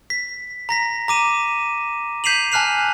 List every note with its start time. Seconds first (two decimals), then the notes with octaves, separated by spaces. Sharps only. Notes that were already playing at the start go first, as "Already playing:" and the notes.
0.10 B6
0.69 A#5 A#6 B6
1.08 A#5 D6 D#7 E7
2.24 G6 B6 C7 D#7 F7 F#7
2.52 G#5 A5 F6 F#6 C7 F7